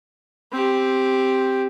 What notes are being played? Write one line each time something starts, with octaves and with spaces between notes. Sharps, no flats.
C4 G4